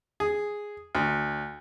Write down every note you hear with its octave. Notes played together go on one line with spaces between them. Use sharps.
G#4
D2